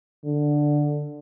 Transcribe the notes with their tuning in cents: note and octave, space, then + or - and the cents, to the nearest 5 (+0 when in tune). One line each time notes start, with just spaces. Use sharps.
D3 +5